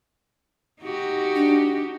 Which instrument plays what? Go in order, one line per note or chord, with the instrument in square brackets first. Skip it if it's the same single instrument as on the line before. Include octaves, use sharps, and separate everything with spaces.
[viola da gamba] D#4 F#4 G4
[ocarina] D4